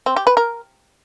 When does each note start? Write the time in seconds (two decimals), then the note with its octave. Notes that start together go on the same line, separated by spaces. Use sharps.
0.06 C4
0.16 G4
0.27 B4
0.37 A#4